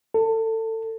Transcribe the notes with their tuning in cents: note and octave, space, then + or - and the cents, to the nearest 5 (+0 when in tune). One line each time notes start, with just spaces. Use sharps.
A4 +25